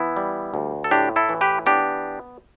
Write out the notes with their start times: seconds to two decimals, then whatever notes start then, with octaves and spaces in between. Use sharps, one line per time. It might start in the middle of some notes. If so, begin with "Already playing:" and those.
Already playing: E3 B3 E4
0.16 G3
0.54 D2
0.84 A4
0.91 A2 D4 G4
1.16 E4 A4
1.29 E3
1.41 G4 B4
1.66 B3 D4 G4